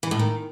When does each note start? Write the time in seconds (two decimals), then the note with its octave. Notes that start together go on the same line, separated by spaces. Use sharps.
0.03 E3
0.11 A2
0.19 D#3